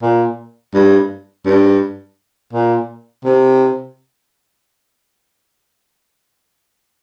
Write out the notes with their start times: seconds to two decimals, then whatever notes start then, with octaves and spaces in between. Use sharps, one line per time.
0.02 A#2
0.74 G2
1.46 G2
2.53 A#2
3.25 C3